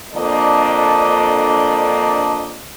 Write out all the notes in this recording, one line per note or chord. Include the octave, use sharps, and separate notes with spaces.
F2 D3 A#3 D4 D5 D#5